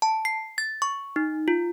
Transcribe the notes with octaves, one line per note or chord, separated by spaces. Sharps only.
A5
C7
A6
C#6
D#4
F4